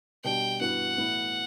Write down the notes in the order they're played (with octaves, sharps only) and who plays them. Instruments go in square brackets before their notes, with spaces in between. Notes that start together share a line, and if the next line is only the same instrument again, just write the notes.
[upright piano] B2 G3 D4 G4 [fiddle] G5
[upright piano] G2 E3 B3 F#4 [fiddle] F#5
[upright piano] A2 E3 B3 E4